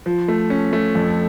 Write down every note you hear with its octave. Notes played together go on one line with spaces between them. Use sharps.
F3
A3
C#4
A3
F2